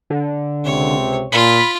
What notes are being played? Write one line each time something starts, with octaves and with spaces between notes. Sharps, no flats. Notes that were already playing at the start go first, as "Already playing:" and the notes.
D3
C#2 C3 C4 C#5
A#2 F4 B5